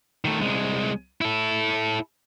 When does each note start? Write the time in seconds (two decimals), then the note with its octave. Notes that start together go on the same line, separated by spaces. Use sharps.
0.25 D#3 A3
0.40 C2 G#3
1.21 E4 A4